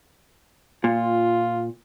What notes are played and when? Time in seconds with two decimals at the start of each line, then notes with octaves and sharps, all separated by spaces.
0.84 A#2 F4